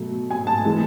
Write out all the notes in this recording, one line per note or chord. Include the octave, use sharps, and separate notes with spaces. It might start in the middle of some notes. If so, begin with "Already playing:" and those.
Already playing: B2 F#3 A3
G#5
A5
A2 E3 G#3